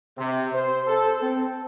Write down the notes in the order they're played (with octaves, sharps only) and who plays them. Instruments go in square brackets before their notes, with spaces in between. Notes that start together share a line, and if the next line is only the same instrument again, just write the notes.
[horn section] C3
C5
A4
C4